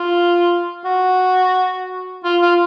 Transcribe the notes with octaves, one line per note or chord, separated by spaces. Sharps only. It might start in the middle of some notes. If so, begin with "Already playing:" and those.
Already playing: F4
F#4
F4
F4